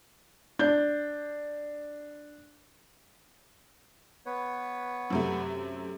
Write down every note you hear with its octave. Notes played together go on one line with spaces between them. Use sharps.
D4 G6
B3 B4 C#5
F#2 C3 A3